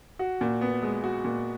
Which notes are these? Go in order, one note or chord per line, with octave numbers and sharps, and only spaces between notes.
F#4
A#2
B3
G#3
F#4
A#2